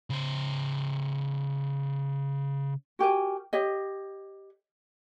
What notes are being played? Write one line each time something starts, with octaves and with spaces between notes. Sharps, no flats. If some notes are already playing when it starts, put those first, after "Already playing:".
C#3 C5
F#4 G4 A#4 G#5
G4 C#5 D#5